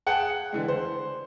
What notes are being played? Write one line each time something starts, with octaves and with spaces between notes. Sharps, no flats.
G#4 F#5 G5 A5
D3 E3 G#3
C5